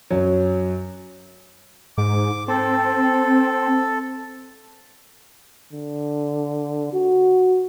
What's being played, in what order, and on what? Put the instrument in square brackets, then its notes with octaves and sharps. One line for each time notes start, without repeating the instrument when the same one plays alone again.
[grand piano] F#2 F#3
[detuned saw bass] G#2 [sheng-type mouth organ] D6
[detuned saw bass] C4 [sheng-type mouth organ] A4
[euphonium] D3
F#4